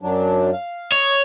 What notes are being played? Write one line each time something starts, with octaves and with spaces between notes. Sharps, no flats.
F#2 F#3 D4
F5
C#5 D#5